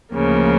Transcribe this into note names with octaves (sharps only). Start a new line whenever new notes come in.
D2 C#3 F3 A#3